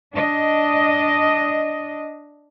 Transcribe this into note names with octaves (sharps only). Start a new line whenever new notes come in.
D4 D#5